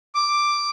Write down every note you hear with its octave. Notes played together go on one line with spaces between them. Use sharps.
D6